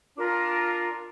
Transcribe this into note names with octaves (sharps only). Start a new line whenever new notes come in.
D4 F4 A#4